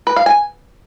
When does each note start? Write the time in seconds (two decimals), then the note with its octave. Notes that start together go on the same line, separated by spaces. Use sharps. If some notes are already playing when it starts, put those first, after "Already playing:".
0.07 B4
0.16 F5
0.26 G#5